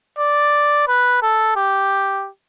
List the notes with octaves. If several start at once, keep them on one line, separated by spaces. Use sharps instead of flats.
D5
B4
A4
G4